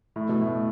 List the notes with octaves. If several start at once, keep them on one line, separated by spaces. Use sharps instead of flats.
A2
B2
A2